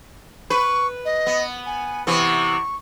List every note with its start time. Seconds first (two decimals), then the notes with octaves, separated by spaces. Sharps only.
0.50 B4 C#6
1.05 D#5
1.27 B3
1.66 G#5
2.07 C3 E3 B3 C#6